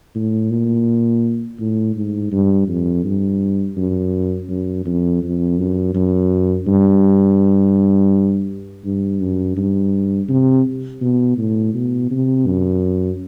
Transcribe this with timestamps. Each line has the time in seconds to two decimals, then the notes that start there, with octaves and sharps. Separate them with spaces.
0.15 A2
0.51 A#2
1.60 A2
1.96 G#2
2.32 G2
2.68 F2
3.04 G2
3.77 F#2
4.49 F#2
4.85 F2
5.22 F2
5.58 F#2
5.94 F#2
6.67 G2
8.85 G2
9.21 F#2
9.57 G2
10.29 C3
11.01 B2
11.38 A2
11.74 B2
12.11 C3
12.47 F#2